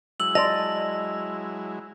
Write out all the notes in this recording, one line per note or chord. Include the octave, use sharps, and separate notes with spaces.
F#3 G#3 E4 E6 F#7
D5 D#5 A5 C6 A#6 F7